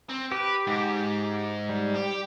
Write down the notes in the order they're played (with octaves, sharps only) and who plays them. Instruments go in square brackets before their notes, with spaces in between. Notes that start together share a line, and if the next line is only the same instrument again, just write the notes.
[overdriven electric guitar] C4
[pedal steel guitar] G4 [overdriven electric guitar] B4
[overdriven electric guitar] G#2
[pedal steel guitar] G3
[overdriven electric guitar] G4